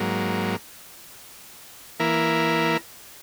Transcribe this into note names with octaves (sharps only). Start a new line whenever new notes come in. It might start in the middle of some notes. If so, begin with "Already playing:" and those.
Already playing: G#2 F#3 A#3
E3 A#3 E4 A#4